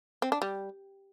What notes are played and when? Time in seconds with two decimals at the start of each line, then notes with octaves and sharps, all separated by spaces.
0.22 C4
0.32 D4
0.42 G3